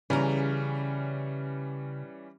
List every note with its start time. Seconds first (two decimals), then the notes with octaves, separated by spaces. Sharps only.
0.10 C#3 E3 G3 C#4 A#5